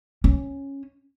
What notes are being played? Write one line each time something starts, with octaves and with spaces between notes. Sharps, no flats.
C#4